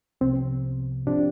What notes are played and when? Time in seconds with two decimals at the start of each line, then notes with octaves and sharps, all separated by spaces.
0.21 C2 C3 F3 B3 C4
1.06 G#2 F3 C4 D4 G4